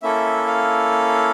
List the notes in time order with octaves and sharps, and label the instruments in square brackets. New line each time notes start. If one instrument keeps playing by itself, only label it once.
[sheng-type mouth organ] A#3 C#4 E4 A4 E5
F5